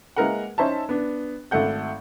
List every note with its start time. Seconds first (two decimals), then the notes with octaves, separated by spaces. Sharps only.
0.16 G#3 A#3 E4 A#4 B4 F#5
0.58 C#4 D#4 C5 C#5 E5 A5
0.89 B3 D4
1.51 G#1 A3 A4 F#5 G6